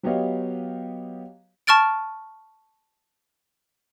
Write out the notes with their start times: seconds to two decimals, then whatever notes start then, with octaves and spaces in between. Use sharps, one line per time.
0.03 F#3 B3 G4 C#5 D#5 F5
1.67 A5 C#6 F6 A6 D7